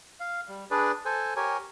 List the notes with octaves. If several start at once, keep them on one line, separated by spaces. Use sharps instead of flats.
F5
G3
D4 G#4 B4 D5
A4 C5 G#5
G4 A#4 C#5 G#5